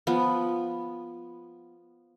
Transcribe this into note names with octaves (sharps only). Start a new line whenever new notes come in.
F3 B3